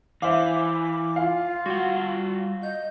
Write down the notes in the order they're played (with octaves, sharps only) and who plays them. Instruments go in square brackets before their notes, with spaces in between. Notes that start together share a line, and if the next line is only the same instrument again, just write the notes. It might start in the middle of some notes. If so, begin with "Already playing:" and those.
[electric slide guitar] E3 [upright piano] C5 E5 F5 [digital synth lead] D6
[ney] F4 [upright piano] F5
[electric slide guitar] G3 F#5 [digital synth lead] F#4
[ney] D#5 [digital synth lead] G6